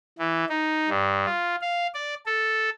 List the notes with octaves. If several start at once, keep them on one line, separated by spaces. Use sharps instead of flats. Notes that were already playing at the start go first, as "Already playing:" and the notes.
E3
D#4
G2
F4
F5
D5
A4